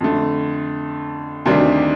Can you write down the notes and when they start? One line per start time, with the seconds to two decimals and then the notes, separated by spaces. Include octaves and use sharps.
0.01 F2 D3 A3
1.46 D2 C3 D#3 G3 D4